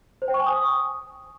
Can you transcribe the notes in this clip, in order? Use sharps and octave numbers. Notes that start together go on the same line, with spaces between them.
C5
G5
C#6
G#5
D#6